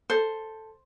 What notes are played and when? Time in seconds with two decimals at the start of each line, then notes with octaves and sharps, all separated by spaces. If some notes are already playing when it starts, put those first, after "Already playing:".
0.10 A4 C5